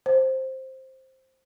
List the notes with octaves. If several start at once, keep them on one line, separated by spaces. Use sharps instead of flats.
C5